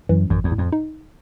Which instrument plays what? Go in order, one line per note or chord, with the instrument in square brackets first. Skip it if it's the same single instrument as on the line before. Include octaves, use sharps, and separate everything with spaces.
[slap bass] F#2 [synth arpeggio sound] E3
[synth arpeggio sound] A1 [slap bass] F#2
[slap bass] E2
[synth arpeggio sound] A2
[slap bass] F2
[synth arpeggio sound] D#4